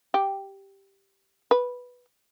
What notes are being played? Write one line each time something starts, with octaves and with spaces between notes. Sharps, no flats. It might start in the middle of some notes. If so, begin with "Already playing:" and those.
G4
B4